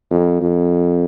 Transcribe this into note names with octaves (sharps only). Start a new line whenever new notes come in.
F2
F2